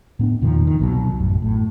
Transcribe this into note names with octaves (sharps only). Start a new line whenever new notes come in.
A2 B3 D4
E2 A#2 D#3 F3
D#3
C2 B2 F#3
A1 F#2
A2